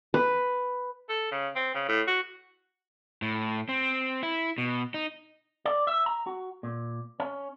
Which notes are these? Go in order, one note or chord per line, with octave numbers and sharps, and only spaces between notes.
B4
A4
C#3
C4
C#3
A2
F#4
A2
C4
E4
B2
D#4
D5
E5
A#5
F#4
A#2
C#4